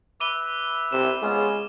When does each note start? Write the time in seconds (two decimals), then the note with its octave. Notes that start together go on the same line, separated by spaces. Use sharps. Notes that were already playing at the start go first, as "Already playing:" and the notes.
0.20 B4 E5 D6 D#7 G7
0.92 C3 E7
1.22 G#3 B3 C#4 F4